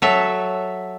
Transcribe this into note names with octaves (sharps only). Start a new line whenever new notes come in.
F#3 A4 E5